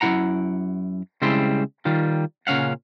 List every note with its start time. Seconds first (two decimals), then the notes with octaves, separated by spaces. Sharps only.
0.01 F#2 G#3 E4 F#5 A#5
1.22 C#3 G3 G#3 C4 E4 C6
1.85 D#3 G3 F4
2.47 A#2 C#3 C#4 F5 F#5